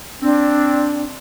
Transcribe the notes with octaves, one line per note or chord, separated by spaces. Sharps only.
C4 D4